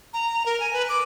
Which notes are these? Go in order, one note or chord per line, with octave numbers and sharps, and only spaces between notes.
A#5
A#4
G#5
B4
D6